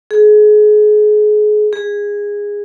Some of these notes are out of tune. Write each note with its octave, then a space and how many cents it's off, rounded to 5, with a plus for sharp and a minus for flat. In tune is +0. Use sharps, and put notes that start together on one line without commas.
G#4 +30
G#4 -15